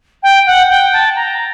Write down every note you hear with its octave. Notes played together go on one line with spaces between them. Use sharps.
G5
F#5
G5
A5
A#5